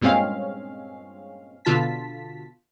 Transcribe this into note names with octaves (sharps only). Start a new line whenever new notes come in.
G2 A#2 G#3 C4 C#4 F5
B2 D3 F4 A5 B6